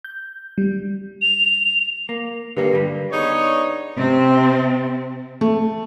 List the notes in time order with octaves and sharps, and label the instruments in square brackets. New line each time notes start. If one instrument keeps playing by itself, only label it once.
[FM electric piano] G6
G3
[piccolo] F7
[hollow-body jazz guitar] A#3
[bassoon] G2 [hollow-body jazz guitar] D3 A#3
[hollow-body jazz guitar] D3 G3
[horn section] B3 D4 D#4 G#4 C#5
[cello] C3 C4
[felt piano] A3